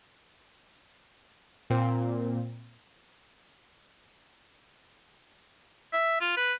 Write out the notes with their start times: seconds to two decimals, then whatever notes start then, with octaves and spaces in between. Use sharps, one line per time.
1.70 A#2 C4
5.93 E5
6.21 F4
6.37 B4